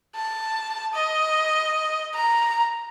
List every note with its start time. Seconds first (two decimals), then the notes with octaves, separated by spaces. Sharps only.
0.16 A5
0.94 D#5
2.15 A#5